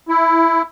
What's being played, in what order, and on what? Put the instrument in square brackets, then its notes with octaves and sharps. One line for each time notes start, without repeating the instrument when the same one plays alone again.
[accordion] E4